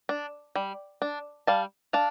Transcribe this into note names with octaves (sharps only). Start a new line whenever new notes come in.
D4
G3
D4
G3 F5 A5
D4 F5 A5